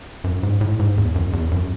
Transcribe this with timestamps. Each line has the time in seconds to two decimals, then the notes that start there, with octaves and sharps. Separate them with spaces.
0.24 F#2
0.43 G#2
0.61 A2
0.79 G#2
0.98 E2
1.16 F#2
1.33 E2
1.51 F#2